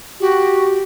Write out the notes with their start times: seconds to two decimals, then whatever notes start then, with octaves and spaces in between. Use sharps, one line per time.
0.20 F#4 G4